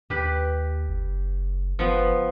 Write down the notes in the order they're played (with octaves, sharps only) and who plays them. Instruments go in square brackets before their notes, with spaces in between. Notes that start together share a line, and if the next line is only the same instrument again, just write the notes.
[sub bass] D#2 [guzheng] G4 B4
[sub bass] F#1
[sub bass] F#1 [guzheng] F3 B3